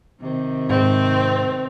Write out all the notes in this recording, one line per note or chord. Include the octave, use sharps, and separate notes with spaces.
C3 D#3
G#2 C4